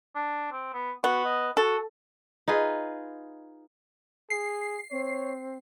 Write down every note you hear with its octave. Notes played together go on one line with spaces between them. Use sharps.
D4
C4
B3
B3 F#4
D#5
F#4 A4
D#4 F4 G#4 B4
G#4 C7
C4 C#5